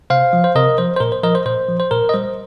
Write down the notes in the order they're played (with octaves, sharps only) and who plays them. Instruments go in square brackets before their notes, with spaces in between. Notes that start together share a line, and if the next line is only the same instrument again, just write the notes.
[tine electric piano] C3 C5 F5
F3
C5
C3 A#4 D#5
F3 C5
C5
A#2 A#4
C5
F3 A#4 D#5
C5
A#2 C5
F3
C5
A#2 A#4
D#5
G3 C5